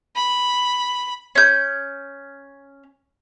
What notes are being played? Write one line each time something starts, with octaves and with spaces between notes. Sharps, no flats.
B5
C#4 G6